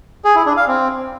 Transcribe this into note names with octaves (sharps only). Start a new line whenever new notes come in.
G#4
E4
D4
F5
C4